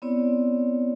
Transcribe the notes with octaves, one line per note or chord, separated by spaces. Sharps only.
B3 C4 E4 C#5 D5